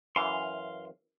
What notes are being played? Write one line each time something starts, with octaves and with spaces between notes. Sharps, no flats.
F#2 E3 F5 C6